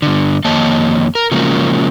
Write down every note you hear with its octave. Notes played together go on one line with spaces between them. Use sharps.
G2 D3
F2 D#3 A#3 C#5 D#5 A5
A#4
C#3 F3 F#3 G#3 A#3